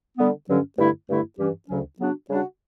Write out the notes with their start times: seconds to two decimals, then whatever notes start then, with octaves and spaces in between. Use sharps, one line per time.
0.18 D3 G3 B3
0.48 G2 D3 F#3 C#4
0.78 G2 D3 A3 E4
1.09 G2 D3 A3 E4
1.38 G2 E3 G3 C#4 G4
1.68 D2 C#3 F#3 C#4
1.99 C#3 F#3 B3 D4 F#4
2.29 C#3 G3 D4 F#4